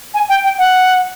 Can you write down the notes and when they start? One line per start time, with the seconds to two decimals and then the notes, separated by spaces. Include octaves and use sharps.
0.14 G#5
0.29 G5
0.44 G5
0.58 F#5